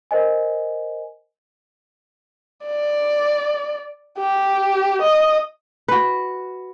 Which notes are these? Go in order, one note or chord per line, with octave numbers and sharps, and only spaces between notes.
A#4 C5 D#5 G#5
D5
G4
D#5
F#4 B4